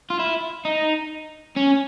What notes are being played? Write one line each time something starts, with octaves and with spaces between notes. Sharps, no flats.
F4
E4
D#4
C#4